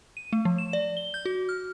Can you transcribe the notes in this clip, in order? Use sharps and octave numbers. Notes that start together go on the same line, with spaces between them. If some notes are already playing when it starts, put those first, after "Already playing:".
D#7
A3
F3
E7
D5
G7
G6
F#4
F6